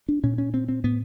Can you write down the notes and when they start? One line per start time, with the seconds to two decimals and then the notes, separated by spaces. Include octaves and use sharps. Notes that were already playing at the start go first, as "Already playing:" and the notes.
0.09 D4
0.23 A#2 C#4
0.38 C#4
0.54 C4
0.69 C4
0.84 A2 B3